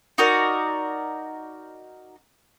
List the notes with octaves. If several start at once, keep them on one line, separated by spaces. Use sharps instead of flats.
D#4 F#4 A#4 D5